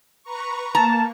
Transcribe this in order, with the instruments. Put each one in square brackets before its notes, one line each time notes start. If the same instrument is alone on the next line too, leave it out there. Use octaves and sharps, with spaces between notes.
[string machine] B4 A#5 C#6
[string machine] A#3 [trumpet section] A5 [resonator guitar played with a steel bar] A#5